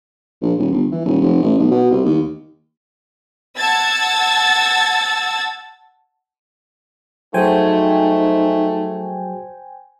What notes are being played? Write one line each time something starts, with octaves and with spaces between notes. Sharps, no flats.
A#1
D#1
G1
E3
D#1
F1
A1
B1
B2
C2
D#2
F#5 A5 E6 G#6 A6
F#3 A3 D#4 F#4 G#4 C5 G5 G#5